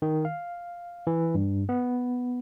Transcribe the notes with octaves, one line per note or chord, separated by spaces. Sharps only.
D#3
F5
E3
G2
B3